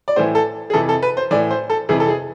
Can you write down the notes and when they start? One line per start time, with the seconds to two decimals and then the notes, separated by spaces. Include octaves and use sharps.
0.08 D5
0.16 A2 E3 C5
0.35 A4
0.70 G#4
0.73 F2 C3 E3 A4
0.89 A4
1.02 B4
1.17 C5
1.31 A2 E3 D5
1.51 C5
1.70 A4
1.89 F2 C3 E3 G#4
2.00 A4
2.08 G#4